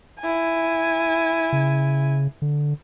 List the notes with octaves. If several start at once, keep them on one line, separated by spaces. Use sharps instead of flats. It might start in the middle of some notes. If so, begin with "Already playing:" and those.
E4 G#5
C#3
D3